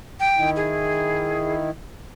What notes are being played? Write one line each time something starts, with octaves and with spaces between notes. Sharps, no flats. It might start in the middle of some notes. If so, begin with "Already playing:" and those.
G5
D#3 D#4 E4
G#4